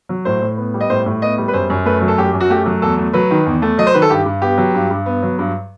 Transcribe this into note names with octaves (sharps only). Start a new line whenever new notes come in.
F#3
A2 C5
A2
B3
G3
D#5
A2 C5
A2
B3 D#5
G3
B4
F#2 C5
F#2
A3 B4
F#3
A4
F#2 G4
F#2
F#4
A3 G4
F#3
E2 A4
A3
F#3 B4
D#3
E2
A3
F#3 D#5
C5
D#3 B4
A4
G2 G4
G2
B3 G4
F#3
G2
G2
B3
F#3
G2